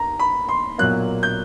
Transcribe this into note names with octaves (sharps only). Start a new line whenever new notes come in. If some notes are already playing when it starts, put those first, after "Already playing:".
Already playing: D#2 A#5
B5
C6
B1 A#2 F#3 A#3 F#6
G6